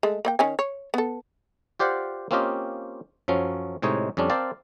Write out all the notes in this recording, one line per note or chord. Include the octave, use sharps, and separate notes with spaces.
G#3 A3
A#3 D#5 G5
D#3 C#4 G#5
C#5
B3 A4
F4 G4 C5 D5 F5 F#5
A#3 C4 C#4 F4 G4 D#5
F#2 F3 F#3 C#4
A2 C3 G#3 D#4 C#5
F2 G3 C#4 D4
C4 A#4 C5 D5 F5 A5